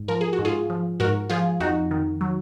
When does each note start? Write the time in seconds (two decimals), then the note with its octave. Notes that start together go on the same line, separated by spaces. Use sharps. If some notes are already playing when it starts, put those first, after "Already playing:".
Already playing: G#2
0.08 F3 A#4
0.21 G#4
0.33 F#4
0.39 G#2
0.45 F4 G#4
0.70 F3
1.00 G#2 F#4 A#4
1.29 F3 F4 G#4
1.60 F2 D#4 F#4
1.91 D#3
2.21 F#3